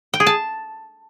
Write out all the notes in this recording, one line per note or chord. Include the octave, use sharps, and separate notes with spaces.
G5
G#4
A5